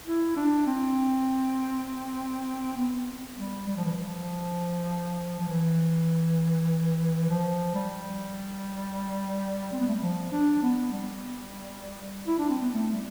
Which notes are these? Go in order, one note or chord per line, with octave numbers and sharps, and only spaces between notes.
E4
D4
C4
B3
G3
G3
F3
E3
F3
F3
E3
F3
G3
C4
B3
A3
G3
F3
D4
B3
G3
E4
D4
C4
B3
A3
G3